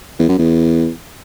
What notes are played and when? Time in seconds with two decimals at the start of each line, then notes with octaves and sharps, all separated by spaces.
0.19 E2
0.29 F#2
0.38 E2